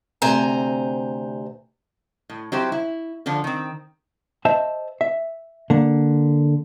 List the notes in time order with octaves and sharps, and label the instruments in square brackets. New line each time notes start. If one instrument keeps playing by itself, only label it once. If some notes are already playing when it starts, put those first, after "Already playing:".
[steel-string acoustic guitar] D2 C3 C5 G#5 A#5
[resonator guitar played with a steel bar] A2
F#3 C4 E4 G4 C5
E4
D3 F3 D4 A4
D#3 C4
[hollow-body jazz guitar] C5 D#5 E5 A5
E5
D3 A#3